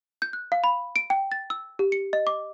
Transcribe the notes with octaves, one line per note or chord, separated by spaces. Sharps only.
G6
F#6
F5
B5
D7
G5
A6
E6
G4
C#7
D#5
D6